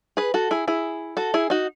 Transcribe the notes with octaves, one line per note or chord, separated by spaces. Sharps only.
G#4 B4
F#4 A4
E4 G#4
E4 G#4
F#4 A4
E4 G#4
D#4 F#4